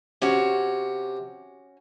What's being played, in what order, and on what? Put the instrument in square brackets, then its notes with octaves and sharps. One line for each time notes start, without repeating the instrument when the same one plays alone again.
[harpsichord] C3 [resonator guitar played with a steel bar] C#4 F#4